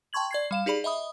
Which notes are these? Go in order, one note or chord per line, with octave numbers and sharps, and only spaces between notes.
G5 A5 C6 C#6 G#6 F#7
D5 G#6 C7
G3 F5 E7
D#4 G4 G#4 D5 B5
D#5 E5 B5 D#6